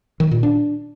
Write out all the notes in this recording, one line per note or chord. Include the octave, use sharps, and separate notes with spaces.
D#3
A#2
D4